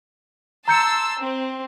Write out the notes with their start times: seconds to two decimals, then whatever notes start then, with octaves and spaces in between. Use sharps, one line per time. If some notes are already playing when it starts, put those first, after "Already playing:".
0.68 A5 A#5 C6 E6 G6 C#7
1.20 C4